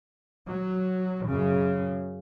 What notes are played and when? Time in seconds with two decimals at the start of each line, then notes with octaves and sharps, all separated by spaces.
0.48 F#3
1.27 F#2 C#3